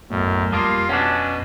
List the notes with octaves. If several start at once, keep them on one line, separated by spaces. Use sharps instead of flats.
F#1 B1 F#2 A2
F2 G3 A#3 F4 A5 D#6
B2 C#4 D4 F#5 A5